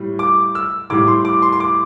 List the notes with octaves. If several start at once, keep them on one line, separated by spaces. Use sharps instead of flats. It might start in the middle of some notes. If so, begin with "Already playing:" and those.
Already playing: A2 G3
D6
E6
A2 G3 D6
C6
D6
C6
C6
D6